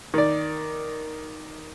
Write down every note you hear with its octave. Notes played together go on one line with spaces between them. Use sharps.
D#3 D5